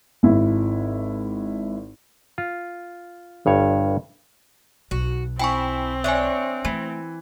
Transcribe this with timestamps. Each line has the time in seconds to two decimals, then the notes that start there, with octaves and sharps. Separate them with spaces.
0.23 G#1 E4
2.38 F4
3.46 G1 G2 C#5
4.91 B1 F#4
5.39 C4 E4 G5 G#5 C#6
6.04 D4 C#5 E5 G#5
6.65 E3 A3